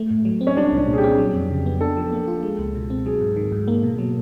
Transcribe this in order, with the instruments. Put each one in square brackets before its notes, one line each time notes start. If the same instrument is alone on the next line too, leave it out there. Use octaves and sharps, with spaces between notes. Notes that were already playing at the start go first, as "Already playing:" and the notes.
Already playing: [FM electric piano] A3
A2
F#3
C4
[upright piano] C#4
[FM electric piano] G3 [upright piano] D4
[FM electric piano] C2
[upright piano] D4
[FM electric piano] A#2
[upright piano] G#4
G4
[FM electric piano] C4
F#3
F2
C#3
B3
[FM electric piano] D4 [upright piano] A4
[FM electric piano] F3
A#3
F4
G#3
C#2
B2
C4
[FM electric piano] F#3 [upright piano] G#4
[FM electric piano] G#2
D#3
G#2
A#3
B2
F#3